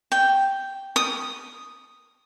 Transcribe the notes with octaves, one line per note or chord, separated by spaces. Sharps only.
G5
D#6